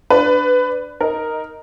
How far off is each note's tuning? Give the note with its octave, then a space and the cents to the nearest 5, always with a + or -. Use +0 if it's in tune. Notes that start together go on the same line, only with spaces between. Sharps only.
D4 +0 B4 +15
D#4 +0 A#4 +0